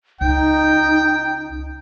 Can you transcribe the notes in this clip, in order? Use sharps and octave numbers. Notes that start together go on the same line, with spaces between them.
C#2 D#4 G5